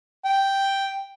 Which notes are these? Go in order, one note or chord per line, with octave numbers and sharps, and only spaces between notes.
G5